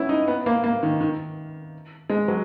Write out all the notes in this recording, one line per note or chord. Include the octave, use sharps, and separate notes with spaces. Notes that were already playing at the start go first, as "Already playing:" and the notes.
Already playing: B3 C#4 E4
D#4
B3
A#3
A#3
D#3
D#3
G#3
F#3